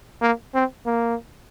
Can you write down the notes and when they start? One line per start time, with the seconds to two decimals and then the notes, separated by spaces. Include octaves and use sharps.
0.21 A#3
0.54 C4
0.86 A#3